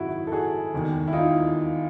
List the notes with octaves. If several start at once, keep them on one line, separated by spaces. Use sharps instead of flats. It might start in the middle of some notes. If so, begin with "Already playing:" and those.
Already playing: G#1 F#2 C#3 F#3 D#4 E4 F#4
A4
F#4 G#4
E1 D#2 D#3
E4
D#4 F4